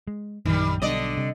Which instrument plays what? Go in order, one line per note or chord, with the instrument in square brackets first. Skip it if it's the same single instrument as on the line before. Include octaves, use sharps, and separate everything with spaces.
[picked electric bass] G#3
[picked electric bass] A#1 F#2 [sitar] D#3 G3
[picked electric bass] B1 B2 G3 [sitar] D3 D5 D#5
[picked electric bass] C3 G3